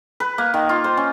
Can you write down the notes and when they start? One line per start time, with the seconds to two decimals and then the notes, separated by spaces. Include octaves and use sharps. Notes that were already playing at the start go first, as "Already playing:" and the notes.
0.20 B4
0.38 A#3
0.54 D#3
0.69 F4
0.84 C5
0.97 C#4